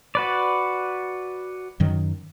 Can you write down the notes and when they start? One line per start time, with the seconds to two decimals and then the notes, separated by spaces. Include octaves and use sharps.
0.15 F#4 B4 D5
1.80 F#2 D#3 F#3